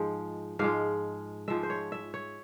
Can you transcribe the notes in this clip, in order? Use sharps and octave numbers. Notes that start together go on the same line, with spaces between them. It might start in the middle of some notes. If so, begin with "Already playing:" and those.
Already playing: G#2 F3 G#3
G#2 F3 G#3 F5
G#2 F3 G#3 E5
C5
C#5
E5
C#5